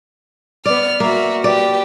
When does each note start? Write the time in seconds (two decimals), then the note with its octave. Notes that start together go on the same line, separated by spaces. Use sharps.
0.66 B3 D5 F6
1.00 A#3 F#4 E5
1.44 G4 B4 D5